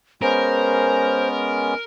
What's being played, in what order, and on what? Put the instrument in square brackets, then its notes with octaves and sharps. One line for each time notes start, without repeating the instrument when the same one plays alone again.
[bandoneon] G#3 B3 C#4 [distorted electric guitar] A#4 [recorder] C5